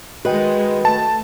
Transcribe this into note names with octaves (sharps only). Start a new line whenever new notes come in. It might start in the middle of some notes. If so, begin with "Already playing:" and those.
D#3 G#3 F#4 B4 D#5 G5
A3 A5